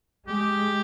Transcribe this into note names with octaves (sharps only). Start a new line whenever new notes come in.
G#3 G4